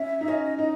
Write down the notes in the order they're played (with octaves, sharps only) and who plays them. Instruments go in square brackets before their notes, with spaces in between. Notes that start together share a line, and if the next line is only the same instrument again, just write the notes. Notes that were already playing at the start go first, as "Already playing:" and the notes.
Already playing: [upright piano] C#4 [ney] E5
[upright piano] D#4
[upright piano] C#4 [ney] D#5
[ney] D#5
[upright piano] D#4 [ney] D#5